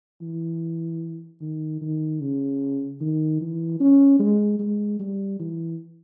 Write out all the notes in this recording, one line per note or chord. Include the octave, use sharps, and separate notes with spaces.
E3
D#3
D#3
C#3
D#3
E3
C#4
G#3
G#3
G3
E3